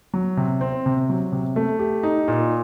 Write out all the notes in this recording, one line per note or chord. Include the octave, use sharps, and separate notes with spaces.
F#3
C3
C4
C3
F#3
C3
A3
G4
D#4
A#2